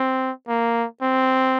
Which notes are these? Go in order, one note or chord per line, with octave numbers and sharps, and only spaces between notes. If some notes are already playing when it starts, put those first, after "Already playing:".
Already playing: C4
A#3
C4